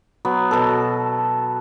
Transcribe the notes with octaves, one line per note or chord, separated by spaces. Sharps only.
F#3 B3
B2 A4